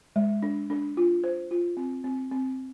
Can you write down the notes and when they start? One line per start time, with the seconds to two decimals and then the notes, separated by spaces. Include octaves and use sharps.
0.16 G#3
0.43 D4
0.70 D4
0.97 F4
1.24 C5
1.51 F4
1.77 C4
2.04 C4
2.31 C4